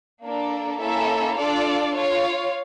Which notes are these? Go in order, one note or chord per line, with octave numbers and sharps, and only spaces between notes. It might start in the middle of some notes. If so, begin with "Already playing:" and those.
A#3 D4 A4 D5
A#3 C#4 E4 A4 E5
D4 F4 A4 D5 F5
F4 C#5 F5